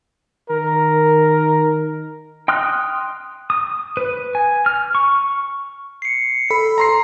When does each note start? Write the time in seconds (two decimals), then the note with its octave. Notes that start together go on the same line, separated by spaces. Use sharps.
0.50 D#3 A#4
2.48 G5 C6 D#6 F6 F#6
3.50 D#6
3.97 B4
4.35 G#5
4.66 F6
4.95 C#6
6.02 C7 C#7
6.51 A4 B5
6.78 A#5 C6 C7